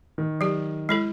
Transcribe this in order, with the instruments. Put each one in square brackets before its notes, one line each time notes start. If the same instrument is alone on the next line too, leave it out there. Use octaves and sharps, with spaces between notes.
[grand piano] D#3
[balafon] F#3 G4
G#3 E4 A4